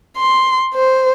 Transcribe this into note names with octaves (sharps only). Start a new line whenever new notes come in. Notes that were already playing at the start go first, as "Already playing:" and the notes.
C6
C5